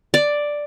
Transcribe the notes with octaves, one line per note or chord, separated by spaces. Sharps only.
D5